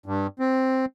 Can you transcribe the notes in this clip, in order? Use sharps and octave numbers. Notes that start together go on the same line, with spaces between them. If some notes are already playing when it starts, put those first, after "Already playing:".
G2
C4